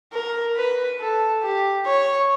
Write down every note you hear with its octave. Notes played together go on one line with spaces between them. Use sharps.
A#4
B4
A4
G4
C#5